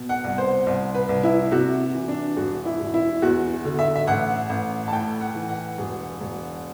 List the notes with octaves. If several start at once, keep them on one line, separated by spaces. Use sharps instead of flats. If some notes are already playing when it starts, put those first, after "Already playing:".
Already playing: B2
F#5
C2
C5
C2
B4
C2
E4
C3 F#4
E3
D4
E1 F#4
E4
E1
E4
E2 F#4
D3
E5
E5
A1 F#5
A1
A5
A2 G5
F#5
E3
F#5
E1
E1